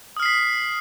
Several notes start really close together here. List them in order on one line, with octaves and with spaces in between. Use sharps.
D#6 F6 C7 B6